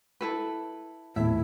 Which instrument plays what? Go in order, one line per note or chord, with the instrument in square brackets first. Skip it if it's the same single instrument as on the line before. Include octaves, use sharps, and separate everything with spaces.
[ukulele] E4 A4 B4
[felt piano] D#1 A3 [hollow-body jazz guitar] A2 [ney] E4 [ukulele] E5